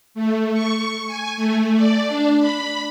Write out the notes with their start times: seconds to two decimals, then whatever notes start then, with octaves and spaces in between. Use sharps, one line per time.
0.14 A3
0.54 C#6
1.07 G#5
1.37 A3
1.76 D5
2.07 D4
2.40 B5